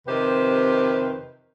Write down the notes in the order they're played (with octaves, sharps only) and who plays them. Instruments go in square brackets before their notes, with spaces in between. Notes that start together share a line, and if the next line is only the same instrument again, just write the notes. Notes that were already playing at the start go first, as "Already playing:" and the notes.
[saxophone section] F2 C3 D#3 G4 B4 C5